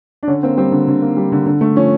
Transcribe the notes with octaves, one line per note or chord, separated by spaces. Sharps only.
D4
D3 C#4
A#3 C4
G3 C4
D3
D3
A#3
G3
D3
D3
A3
F3 C#4